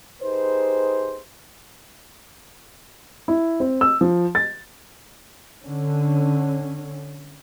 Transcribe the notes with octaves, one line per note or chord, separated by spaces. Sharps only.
D#4 G4 G#4 B4 C5
E4
C4
E6
F3
A6
D3 C#4